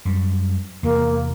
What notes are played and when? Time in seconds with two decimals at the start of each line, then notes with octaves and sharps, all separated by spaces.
0.05 F#2 G3
0.83 E2 C3 A#3